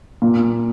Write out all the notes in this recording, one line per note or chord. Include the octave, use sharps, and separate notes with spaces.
A#2